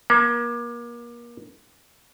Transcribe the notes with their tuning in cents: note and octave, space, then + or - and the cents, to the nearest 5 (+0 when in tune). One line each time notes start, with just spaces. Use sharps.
A#3 +35